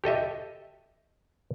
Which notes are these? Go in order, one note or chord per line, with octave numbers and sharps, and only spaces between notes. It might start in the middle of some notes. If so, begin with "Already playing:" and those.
G4 A4 D#5 E5